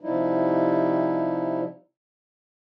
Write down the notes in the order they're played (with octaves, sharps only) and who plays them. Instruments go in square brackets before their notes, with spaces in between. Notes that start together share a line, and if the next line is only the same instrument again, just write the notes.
[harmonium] C3 F3 G3 D#4 E4